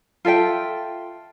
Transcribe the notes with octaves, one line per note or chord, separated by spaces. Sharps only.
F4 A4 E5 G5